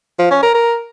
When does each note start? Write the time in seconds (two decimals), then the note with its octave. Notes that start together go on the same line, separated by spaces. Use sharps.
0.19 F3
0.31 C#4
0.43 A#4
0.55 A#4